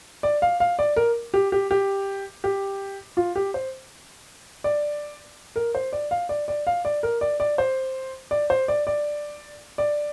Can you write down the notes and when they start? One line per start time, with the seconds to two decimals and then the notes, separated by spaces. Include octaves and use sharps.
0.23 D5
0.42 F5
0.60 F5
0.79 D5
0.96 A#4
1.34 G4
1.52 G4
1.71 G4
2.44 G4
3.17 F4
3.36 G4
3.54 C5
4.64 D5
5.56 A#4
5.75 C5
5.93 D5
6.11 F5
6.29 D5
6.48 D5
6.67 F5
6.85 D5
7.03 A#4
7.21 D5
7.40 D5
7.58 C5
8.31 D5
8.50 C5
8.68 D5
8.87 D5
9.78 D5